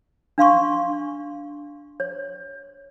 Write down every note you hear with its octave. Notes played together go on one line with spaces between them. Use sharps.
D4 F5 C6 C#6
C#5